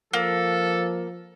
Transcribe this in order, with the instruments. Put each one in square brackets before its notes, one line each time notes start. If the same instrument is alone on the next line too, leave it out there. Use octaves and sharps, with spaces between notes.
[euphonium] F3 [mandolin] A#3 [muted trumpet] A4